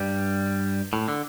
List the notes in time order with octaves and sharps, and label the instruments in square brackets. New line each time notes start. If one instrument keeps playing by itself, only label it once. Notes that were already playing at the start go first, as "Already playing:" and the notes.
Already playing: [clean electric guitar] G2 G3
A2
D3